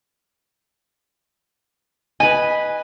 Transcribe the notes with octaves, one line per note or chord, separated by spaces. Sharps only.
B4 D#5 G#5